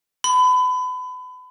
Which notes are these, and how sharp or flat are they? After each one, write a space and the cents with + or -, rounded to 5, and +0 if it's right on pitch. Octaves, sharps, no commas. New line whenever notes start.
B5 +30